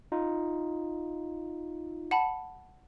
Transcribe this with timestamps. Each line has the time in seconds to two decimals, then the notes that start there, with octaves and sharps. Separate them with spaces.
0.12 D#4 F4
2.11 F#5 A5 B5